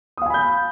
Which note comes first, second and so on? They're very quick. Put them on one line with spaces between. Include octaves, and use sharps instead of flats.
D#6 F5 G#5 B5 G6